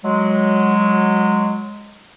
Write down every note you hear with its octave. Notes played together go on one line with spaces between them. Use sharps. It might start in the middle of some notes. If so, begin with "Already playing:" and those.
F#3 G#3